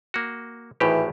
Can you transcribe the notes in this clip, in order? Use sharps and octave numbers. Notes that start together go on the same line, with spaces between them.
A#3 F#4
G#1 A2 E3 G4